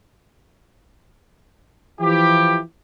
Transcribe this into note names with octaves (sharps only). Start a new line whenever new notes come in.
E3 F3 E4 G4